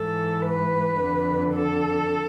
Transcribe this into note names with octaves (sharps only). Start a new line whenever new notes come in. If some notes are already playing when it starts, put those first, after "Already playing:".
Already playing: G#2 E3 A4
B4
F2 D3
A4